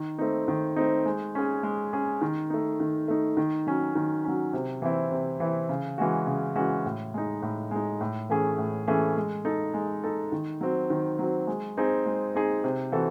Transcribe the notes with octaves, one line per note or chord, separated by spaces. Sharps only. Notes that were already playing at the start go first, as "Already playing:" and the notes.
Already playing: D#3
A3 C4 D#4
D#3
A3 C4 D#4
G#3
C#4 G#4
G#3
C#4 G#4
D#3
A3 D#4
D#3
A3 D#4
D#3
F#3 C#4
D#3
F#3 C#4
C3
E3 C4 E4
C3
E3 C4 E4
C#3
E3 G#3 C#4 F#4
C#3
E3 G#3 C#4 F#4
A2
G#3 D#4
A2
G#3 D#4
A2
E3 A3 C#4 G#4
A2
E3 A3 C#4 G#4
G#3
D#4 A4
G#3
D#4 A4
D#3
F#3 C4
D#3
F#3 C4
G#3
C4 D#4 G#4
G#3
C4 D#4 G#4
C3
E3 C4 F#4 A4